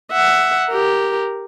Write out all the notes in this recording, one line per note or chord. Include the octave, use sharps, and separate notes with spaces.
E5 F#5
G4 A#4